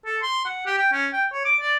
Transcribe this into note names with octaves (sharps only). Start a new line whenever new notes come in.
A4
C6
F#5
G4
G5
C#4
G5
C#5
D6
D5